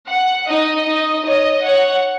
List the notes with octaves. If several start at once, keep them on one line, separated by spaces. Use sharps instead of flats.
F#5
D#4 D#5
D#4
C#5 D#5
C#5 F#5